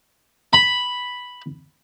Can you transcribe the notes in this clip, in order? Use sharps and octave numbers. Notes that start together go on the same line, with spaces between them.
B5